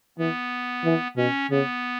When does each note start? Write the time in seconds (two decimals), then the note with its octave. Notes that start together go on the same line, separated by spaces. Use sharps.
0.18 E3 B3
0.84 E3
1.17 B2 C#4
1.50 C#3 B3